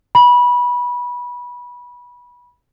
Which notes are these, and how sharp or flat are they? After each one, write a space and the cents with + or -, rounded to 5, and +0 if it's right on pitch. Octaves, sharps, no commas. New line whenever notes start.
B5 -20